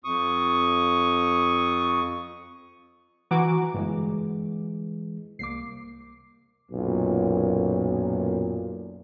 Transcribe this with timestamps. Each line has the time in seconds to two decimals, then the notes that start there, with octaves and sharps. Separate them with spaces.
0.04 F2 C#6 D#6
3.31 E3 F#4 G#5 A#5 D6
3.74 G1 E3 G#3
5.39 C2 A#3 D6 C7
6.71 B1 F#2 A#2